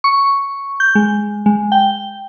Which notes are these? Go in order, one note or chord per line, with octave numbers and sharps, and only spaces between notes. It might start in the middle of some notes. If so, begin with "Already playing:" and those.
C#6
G6
G#3
G#3
G5